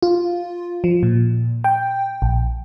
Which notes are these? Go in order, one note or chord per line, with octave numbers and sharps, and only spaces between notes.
F4
F3
A#2
G5
A#1